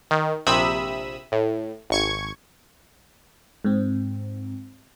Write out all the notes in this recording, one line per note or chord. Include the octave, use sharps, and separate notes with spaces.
D#3
A#1 C3 E5 B5 D#6 E6
A2
G#1 C#6 G#6
G#2 C4